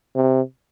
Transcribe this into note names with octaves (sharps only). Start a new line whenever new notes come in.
C3